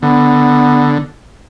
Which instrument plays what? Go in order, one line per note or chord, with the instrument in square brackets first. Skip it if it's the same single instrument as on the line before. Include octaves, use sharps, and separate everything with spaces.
[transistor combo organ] D3 [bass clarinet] B3